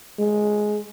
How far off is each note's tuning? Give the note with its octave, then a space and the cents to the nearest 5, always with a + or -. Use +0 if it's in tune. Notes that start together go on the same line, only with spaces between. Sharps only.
G#3 +10